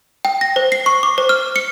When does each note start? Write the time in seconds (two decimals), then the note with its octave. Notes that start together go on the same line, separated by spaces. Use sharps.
0.25 G5
0.41 A#6
0.56 C5
0.72 C7
0.86 C#6
1.03 D6
1.18 C5
1.29 F6
1.56 C#7